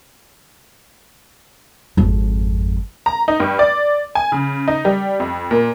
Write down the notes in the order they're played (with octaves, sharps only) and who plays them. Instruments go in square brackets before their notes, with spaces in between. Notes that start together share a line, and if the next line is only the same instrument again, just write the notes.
[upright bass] G#1 F2
[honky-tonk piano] A#5
D#4
G2
D5
G#5
C#3
D#4
G3
F2
A#2